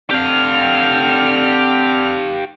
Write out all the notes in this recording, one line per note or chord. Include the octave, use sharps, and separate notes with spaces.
D3 C4 G4 F5 F6